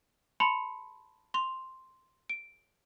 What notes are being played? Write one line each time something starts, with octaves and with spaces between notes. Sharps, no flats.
A5 B5 C6 C#7 F7
C6 F7
D7